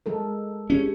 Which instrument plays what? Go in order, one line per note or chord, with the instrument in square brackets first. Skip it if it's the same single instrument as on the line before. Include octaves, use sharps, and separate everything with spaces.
[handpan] G#3 A4 A#4
[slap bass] C#4 [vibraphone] G4 G#4